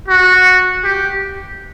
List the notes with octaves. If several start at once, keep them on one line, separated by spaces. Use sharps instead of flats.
F#4
G4